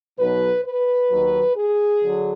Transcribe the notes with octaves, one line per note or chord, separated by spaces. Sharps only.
B1 B2 F#3 B4
B4
D#2 D#3 F#3
G#4
D3 F#3